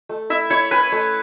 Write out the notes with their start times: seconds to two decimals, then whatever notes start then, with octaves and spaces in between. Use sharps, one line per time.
0.09 A3
0.30 E4 E5
0.50 E4 C#5
0.71 C#4 B4
0.92 A3